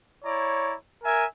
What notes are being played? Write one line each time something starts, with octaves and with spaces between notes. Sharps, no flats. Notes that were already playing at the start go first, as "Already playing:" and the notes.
E4 C#5 D5 A#5
A#4 E5 G#5